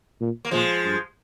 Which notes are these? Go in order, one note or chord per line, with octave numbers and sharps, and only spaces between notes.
A#2
A#3
A#2 F3 G#3
G2